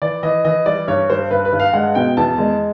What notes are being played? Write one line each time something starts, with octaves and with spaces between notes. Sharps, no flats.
E3 D5
E3 D#5
E3 D#5
G3 D5
G2 C#5
G3 C5
G2 B4
B4
G2
F5
G#3 F#5
B2 G5
E2 A5
G#3